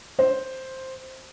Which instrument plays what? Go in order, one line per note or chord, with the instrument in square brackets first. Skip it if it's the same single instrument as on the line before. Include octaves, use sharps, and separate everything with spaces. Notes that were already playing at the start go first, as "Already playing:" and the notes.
[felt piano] C5